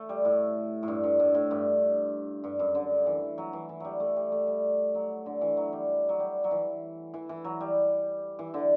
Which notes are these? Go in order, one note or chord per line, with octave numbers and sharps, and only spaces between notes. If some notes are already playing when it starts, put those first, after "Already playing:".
Already playing: A3
G3
A2
A2
G2
G2
A2
A2
G2
G2
F#2
D3
E3
F#3
E3
E3
F#3 G3
A3
G3
A3
G3
F#3
D3
E3
F#3
G3
F#3
G3
F#3
E3
E3
E3
F#3
G3
E3
D3